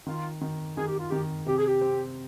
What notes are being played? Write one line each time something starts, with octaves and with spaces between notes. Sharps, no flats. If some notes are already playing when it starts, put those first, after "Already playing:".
D#3 F4
D#3
D#3 G#4
G4
F4
D#3 G4
C3 G4
G#4
G4
C4